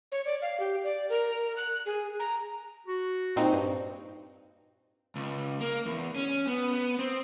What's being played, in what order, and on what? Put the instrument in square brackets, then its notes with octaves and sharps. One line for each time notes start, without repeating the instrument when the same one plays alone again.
[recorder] C#5
D5
F5
G4
D5
A#4
F#6
G#4
A#5
[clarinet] F#4
[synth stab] A#2 C4 D#4
G2
[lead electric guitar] C#2
A#3
E2
C#4
B3
B3
C4